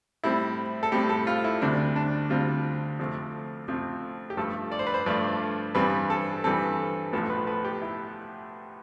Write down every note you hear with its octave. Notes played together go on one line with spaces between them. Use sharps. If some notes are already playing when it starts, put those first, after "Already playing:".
A2 G3 C4 E4
A4
A2 G3 C4 G4
A4
F4
E4
D2 C3 G3 C4 D4
D4
D2 C3 G3 C4 F4
F2 C3 F3 A3 C4
F2 C3 F3 A3 C4
G4
G2 F3 A3 A4
D5
C5
B4
C5
G2 F3 A3 D5
G2 E3 G3 C4 B4
A4
G2 E3 G3 C4 A4
B1 A2 F3 B3 A4
B4
B4
G4
E4